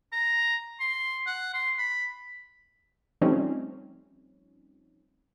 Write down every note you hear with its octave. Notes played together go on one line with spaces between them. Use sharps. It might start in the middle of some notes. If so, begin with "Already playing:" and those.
A#5
C6
F#5
C6
B5
F3 G3 A3 C4 C#4 D#4